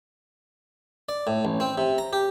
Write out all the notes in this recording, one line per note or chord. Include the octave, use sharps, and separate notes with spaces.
D5
A2
A1
C4
C3
A#5
G4